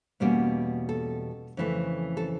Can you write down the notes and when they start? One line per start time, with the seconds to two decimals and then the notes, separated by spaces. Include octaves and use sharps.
0.20 E2 B2 G3 A#3 C#4
0.89 A4
1.57 F2 C#3 E3 A3
2.17 A4